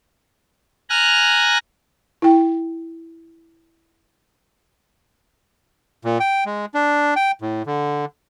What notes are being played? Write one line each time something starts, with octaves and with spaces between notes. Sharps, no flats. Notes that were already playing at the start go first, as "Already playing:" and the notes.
G#5 A#5 F6 F#6
E4 G5
A#2
G5
G#3
D4
G5
A2
D3